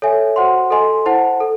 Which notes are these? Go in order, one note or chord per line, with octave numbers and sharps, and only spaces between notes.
A4 C#5 E5 G#5
F#4 C5 F#5 C6
A4 D#5 G#5 C6
E4 C5 F#5 A5
A4